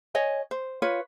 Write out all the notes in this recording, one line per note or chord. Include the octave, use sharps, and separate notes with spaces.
C#5 D#5 G#5
C5
F4 B4 C#5